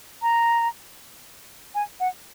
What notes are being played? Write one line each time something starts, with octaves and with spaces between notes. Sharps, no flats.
A#5
G#5
F#5